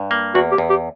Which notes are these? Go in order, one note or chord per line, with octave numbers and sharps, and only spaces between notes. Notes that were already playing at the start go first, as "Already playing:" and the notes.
Already playing: G2
A#3
E2 F#4
G4
E2
G4